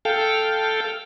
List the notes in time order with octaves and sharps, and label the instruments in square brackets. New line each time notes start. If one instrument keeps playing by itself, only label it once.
[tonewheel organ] A4 F5 G5